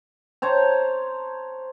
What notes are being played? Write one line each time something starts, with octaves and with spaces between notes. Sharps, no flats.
C5 C#5 A5 A#5